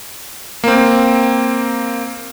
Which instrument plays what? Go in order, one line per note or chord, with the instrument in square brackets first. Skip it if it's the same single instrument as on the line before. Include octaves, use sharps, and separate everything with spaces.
[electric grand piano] A#3 C4